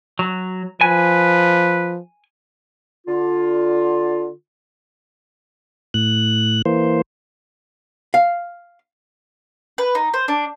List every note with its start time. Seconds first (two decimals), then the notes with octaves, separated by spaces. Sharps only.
0.19 F#3
0.81 F3 B4 G#5
3.07 D3 F4
5.94 A2 F#6
6.66 E3 A#3 C5
8.14 F5
9.78 B4
9.95 D#4
10.14 C5
10.28 D4